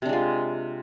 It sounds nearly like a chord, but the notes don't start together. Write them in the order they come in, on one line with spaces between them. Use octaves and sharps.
C3 D4 G#3 F4